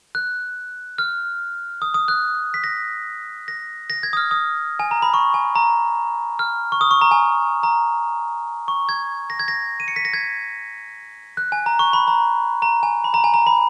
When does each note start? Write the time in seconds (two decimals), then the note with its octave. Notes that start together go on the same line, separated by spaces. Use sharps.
0.15 F#6
0.98 F6
1.82 D#6
1.94 D#6
2.08 F#6
2.54 B6
2.64 A#6
3.48 A#6
3.90 A#6
4.03 G#6
4.13 D#6
4.17 F6
4.31 D#6
4.80 G#5
4.91 A#5
5.02 B5
5.14 C#6
5.34 G#5
5.56 A#5
6.39 F6
6.72 C#6
6.81 D#6
6.91 C#6
7.01 A#5
7.11 G#5
7.63 A#5
8.68 C#6
8.89 G#6
9.30 A#6
9.39 G#6
9.48 A#6
9.80 D#7
9.88 C#7
9.96 B6
10.05 A#6
10.13 G#6
11.37 F#6
11.52 G#5
11.66 A#5
11.79 C#6
11.93 B5
12.08 A#5
12.62 A#5
12.83 G#5
13.04 B5
13.14 A#5
13.24 G#5
13.34 A#5
13.47 B5